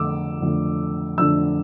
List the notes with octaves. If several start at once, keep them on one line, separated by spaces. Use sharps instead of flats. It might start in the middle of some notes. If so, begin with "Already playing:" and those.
Already playing: F2 D3 A3 D4 D6 E6
F2 D3 A3 D4
F2 D3 A3 D4 E6